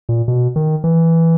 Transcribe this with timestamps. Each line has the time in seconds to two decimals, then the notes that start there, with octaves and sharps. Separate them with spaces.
0.09 A#2
0.28 B2
0.56 D#3
0.84 E3